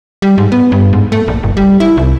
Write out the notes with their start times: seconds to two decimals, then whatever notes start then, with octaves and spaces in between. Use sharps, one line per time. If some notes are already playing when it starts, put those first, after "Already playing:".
0.22 G3
0.38 G#2
0.52 B3
0.72 G2
0.93 G#2
1.12 A3
1.28 A#1
1.43 F#1
1.57 G3
1.80 E4
1.97 C2